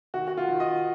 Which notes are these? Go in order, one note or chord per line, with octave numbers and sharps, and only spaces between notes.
D#3 F#4
F#4
F4
D#3
D#5